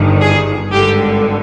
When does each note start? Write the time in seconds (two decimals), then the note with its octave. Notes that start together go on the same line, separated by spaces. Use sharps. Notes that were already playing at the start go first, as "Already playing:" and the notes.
Already playing: G1 G2 D#3
0.20 G#4
0.72 G#1 G2 D3 G4